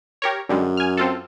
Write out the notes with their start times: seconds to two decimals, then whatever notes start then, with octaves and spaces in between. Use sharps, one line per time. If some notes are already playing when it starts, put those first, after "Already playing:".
0.22 G4 A#4 C#5
0.49 F#2 D3 G3 G#3
0.77 G#5 F6
0.97 C4 F4 A4